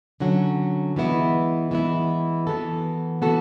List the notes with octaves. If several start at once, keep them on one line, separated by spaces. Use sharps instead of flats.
D3 F#3 C#4 F#4
E3 G#3 B3 E4
E3 G#3 B3 E4
E3 B3 F#4 A4
E3 B3 F#4 A4